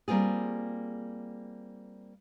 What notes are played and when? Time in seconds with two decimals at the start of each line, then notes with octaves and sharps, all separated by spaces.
0.08 G3 A#3 C4 F4 G#4